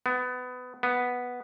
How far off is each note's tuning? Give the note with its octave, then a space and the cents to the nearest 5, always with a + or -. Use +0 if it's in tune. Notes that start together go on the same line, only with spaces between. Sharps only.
B3 +20
B3 -5